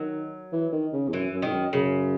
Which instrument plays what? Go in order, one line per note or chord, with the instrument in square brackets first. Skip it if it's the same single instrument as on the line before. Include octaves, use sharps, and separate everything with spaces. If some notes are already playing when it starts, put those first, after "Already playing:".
Already playing: [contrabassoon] D#3 [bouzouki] F#3
[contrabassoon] E3
D#3
C#3
E2
[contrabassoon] F#2 [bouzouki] E3
[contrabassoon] F#2
[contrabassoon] G#2 [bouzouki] D#3
[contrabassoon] F#2
[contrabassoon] F#2 [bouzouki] C#3